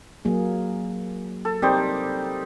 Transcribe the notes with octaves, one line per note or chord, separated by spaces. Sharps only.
F#3 A#3 G#4
A4
G3 C4 D#4 A#4 C5 D5